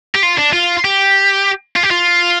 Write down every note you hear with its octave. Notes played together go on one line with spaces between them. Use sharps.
G4
F4
D4
F4
G4
F4
G4
F4